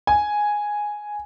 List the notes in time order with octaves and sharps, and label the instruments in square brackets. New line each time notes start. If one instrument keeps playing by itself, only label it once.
[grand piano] G#5